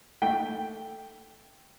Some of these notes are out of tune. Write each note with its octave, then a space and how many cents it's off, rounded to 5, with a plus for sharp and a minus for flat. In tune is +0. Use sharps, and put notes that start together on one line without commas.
A3 +0 G5 +0